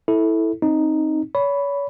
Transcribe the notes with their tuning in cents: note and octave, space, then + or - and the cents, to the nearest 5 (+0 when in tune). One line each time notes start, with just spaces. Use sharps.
E4 -15 A4 +0
C4 +20 D#4 +0
C#5 +35 B5 +0